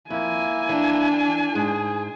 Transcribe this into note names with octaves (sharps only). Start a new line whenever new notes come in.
F2 A#3 E4 G#5
E3 D4
G#2 G#4